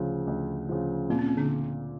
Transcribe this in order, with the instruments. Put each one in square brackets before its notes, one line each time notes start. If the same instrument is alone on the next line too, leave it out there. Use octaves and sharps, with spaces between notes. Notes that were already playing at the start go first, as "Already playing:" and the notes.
Already playing: [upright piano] D2 C#3 F3
D2
C#3 F3
[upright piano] A#2 [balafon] C4
[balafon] C#4
C4
D3 D4